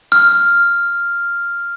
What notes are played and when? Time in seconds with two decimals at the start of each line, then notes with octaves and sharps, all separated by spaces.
0.12 F6